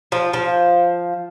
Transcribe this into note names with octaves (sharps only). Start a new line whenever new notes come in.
F3
F3